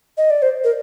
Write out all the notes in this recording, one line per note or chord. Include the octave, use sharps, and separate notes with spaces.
D#5
D5
C5
A#4